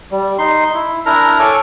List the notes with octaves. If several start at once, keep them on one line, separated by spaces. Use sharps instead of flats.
G3
D#4 C6
E4
D4 E4 A#4 A#5
A4 C#5 G#5 D6